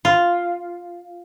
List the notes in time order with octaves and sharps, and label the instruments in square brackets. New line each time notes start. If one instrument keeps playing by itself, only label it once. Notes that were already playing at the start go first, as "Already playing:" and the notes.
[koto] F4